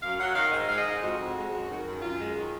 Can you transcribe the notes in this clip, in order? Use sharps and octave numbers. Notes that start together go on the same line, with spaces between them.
F#2 F5
F#3 F#5
D#3 F5
G#2 D#5
G#3 F5
D#5
G#2
F2 F#4
F2
G#3
F#2
D#3
F#2
F#2 F4
G#3
D#3